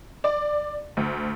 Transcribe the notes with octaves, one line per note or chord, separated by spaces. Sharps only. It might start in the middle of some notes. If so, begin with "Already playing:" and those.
D5
D2